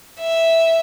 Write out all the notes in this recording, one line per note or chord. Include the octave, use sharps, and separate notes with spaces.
E5